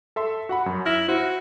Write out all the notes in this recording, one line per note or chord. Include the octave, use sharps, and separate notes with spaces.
A4 E5 C6
F#4 F#5 B5
F#2
E4 F6 A#6
E4 F#4 C5